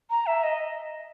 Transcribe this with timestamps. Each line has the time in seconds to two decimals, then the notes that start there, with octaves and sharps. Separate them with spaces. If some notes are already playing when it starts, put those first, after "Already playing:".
0.10 A#5
0.26 E5
0.43 D#5